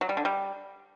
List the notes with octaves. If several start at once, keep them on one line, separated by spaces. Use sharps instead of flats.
F#3
G3
D3
G3